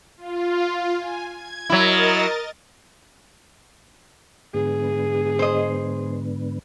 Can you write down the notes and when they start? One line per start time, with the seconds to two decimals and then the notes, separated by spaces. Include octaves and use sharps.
0.17 F4
0.97 G#5
1.32 G#6
1.70 F#3 E4 A#4 D#5 A6
4.54 G#2 D3 B3 G#4
5.39 C5 D#5